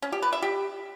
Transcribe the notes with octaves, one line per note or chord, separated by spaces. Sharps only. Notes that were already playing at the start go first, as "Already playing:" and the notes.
C#4
G4
B4
E5
G4